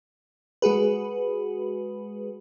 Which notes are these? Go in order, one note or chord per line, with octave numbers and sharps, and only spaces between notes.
G#3 F#4 G#4 B4